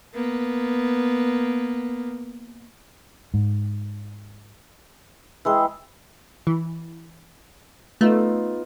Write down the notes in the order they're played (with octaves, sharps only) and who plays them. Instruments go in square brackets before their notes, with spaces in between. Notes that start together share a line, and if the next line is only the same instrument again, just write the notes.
[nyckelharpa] A#3 B3
[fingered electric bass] G#2
[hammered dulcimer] E3 G#3 G#4 [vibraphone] G5 E6
[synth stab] E3
[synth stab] A3 [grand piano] B3 D#4 F4